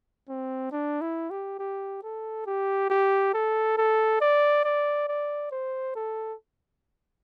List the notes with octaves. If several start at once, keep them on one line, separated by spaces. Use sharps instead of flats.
C4
D4
E4
G4
G4
A4
G4
G4
A4
A4
D5
D5
D5
C5
A4